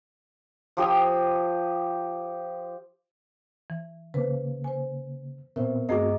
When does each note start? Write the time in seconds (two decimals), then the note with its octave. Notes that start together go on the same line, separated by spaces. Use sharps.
0.77 F3 G4 D#6 E6
3.70 E3
4.14 C#3 A#3 B4 C5
4.64 C5 G#5
5.56 A#2 B3 C4 A#4 C5 E5
5.89 G2 A3 C4 F#4 G#4 D#5 A#5 D6